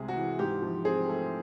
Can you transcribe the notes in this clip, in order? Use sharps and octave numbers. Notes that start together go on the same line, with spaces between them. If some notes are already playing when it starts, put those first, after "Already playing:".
Already playing: C2 C3 G#3 G#4
F#4
E3
G#2 G4
F3
C4 G#4
A3